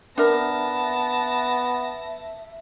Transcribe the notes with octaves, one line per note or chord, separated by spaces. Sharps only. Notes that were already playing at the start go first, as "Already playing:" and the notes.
B3 D4 A#4 E5 A5 A#6